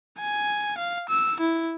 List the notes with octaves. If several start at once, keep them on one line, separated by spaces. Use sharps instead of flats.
G#5
F5
E6
E4